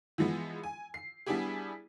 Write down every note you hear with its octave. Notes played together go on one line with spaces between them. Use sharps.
E3 F3 G#3 B3
G#5
C7
G3 B3 D4 E4 G4 G#4